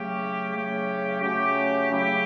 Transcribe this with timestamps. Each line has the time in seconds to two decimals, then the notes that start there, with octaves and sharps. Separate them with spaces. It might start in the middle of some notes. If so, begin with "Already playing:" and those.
Already playing: C#3 F#3 A3 C#4 G4
0.51 C#3 F#3 A3 C#4 G4
1.21 C#3 F#3 A3 C#4 G4
1.91 C#3 F#3 A3 E4 G4